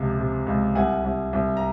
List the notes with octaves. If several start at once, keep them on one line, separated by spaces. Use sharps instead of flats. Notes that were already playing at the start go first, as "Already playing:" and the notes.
Already playing: C#2 C3 F3
C3
C#2
C2 F#5 G#5
C2
C2
A#5